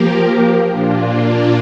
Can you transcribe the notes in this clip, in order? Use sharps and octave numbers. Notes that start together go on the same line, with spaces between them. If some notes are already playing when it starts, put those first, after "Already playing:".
Already playing: F3 A#3 G4 A#4
A#2 A#3 D4 F4